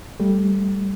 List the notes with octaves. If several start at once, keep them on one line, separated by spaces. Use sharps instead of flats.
G3 A3